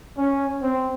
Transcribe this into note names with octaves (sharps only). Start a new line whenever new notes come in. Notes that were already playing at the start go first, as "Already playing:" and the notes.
C#4
C4